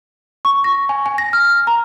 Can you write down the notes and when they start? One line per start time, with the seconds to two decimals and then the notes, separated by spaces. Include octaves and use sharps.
0.45 C#6
0.64 A#6
0.89 G#5
1.06 G#5
1.18 A#6
1.33 F6
1.67 A#5